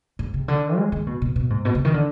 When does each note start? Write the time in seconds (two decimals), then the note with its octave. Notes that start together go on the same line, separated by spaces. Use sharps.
0.19 G#2
0.34 C3
0.48 D3
0.77 G#3
0.92 D#3
1.07 B2
1.22 B2
1.36 B2
1.50 G#2
1.65 B2
1.75 C3
1.85 D#3
1.94 D3